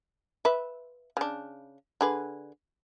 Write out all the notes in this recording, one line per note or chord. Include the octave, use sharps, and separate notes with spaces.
B4 E5
C#3 D4
D3 G#4 B4